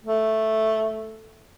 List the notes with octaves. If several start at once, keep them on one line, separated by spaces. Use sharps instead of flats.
A3